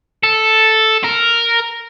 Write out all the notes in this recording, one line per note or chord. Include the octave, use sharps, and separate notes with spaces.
A4
A#4